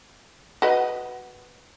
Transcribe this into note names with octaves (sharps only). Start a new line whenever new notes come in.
F#4 B4 D#5